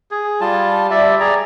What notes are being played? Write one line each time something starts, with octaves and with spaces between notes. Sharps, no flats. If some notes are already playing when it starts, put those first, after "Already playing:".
G#4
G3 F4 A5
G3 D5 E5
G#4 D5 A#5